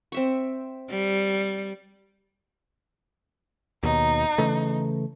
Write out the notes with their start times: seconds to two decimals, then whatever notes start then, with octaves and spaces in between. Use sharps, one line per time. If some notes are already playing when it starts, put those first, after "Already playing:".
0.12 C4 E5 C#6
0.90 G3
3.83 D#2 B2 D#4
4.38 C#3 E3 A3